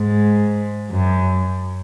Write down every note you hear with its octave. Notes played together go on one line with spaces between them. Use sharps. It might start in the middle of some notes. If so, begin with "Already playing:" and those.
Already playing: G#2
F#2